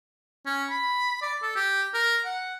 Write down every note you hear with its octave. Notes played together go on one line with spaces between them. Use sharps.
C#4
B5
D5
A4
G4
A#4
F#5